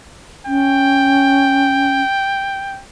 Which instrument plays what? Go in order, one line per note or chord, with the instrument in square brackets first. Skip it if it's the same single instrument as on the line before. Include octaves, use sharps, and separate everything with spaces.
[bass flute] C#4 [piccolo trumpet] G5